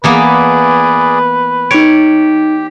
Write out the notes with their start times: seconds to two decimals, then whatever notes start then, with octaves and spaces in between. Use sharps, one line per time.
0.04 E3 A#3 B3 G#4 B4 D5
1.71 D#4 G4 C#5 D7